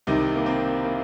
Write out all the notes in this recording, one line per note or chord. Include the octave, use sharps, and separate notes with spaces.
C2 C3 D#3 D#4
A#3
C4
A#3